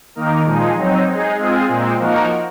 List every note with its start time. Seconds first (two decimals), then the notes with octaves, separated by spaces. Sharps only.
0.15 D#3 A#3 D#4 A#4
0.46 A#2 F3 G#3 D#4 G#4
0.77 F#3 C4 D#4
1.07 G#3 D#4 G#4
1.38 G#3 C4 F4 G#4
1.68 A#2 G#3 C4
1.99 F3 A#3 D#4 F#4 A#4